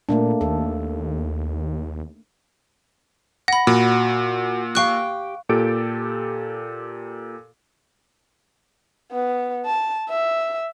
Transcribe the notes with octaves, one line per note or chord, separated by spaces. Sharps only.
A#2 A3 A#3 D4
D#2 A4
F#5 B5 A#6
A#2 F#4
G4 F5 G5 C#6 F#6
A#2 G4 A4 D7
B3
A5
E5